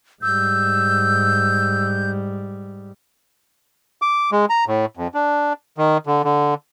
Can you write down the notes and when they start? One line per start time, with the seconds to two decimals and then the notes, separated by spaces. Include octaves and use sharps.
0.22 G#2 G3 E6 G6
4.02 D6
4.32 G#3
4.50 A#5
4.67 A2
4.97 F2
5.14 D4
5.78 D#3
6.06 D3
6.24 D3